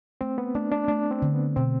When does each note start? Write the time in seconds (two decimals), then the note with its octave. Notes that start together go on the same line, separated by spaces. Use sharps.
0.21 A3 C4
0.38 B3
0.55 A3 D4
0.71 D4
0.88 A3 D4
1.11 C4
1.22 D3
1.34 B3
1.56 B2 C4